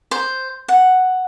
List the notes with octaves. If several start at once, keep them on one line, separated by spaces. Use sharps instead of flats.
C5
F#5